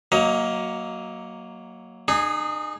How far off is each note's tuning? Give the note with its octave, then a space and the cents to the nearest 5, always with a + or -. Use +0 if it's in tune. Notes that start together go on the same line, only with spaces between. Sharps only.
F#3 +0 A#3 +0 D#5 +25
D#4 -40 G#4 -5